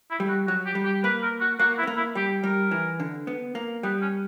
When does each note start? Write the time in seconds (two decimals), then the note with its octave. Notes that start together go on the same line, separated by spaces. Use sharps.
0.11 E4
0.20 G3
0.29 F#4
0.47 F#3 F#4
0.66 G4
0.75 G3
0.85 G4
1.04 A#3 B4
1.22 A#4
1.41 F#4
1.59 A#3 F#4
1.78 E4
1.83 B3
1.87 A#3
1.97 E4
2.15 G3 G4
2.44 G3 A#4
2.71 E3
3.00 D3
3.27 B3
3.55 A#3
3.83 G3 B3
4.02 C#4